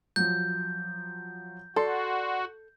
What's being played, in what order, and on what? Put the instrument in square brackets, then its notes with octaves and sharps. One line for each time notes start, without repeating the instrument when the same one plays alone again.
[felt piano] F3 F#3 [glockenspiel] G6
[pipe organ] F#4 [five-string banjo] A4 [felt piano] D5 C6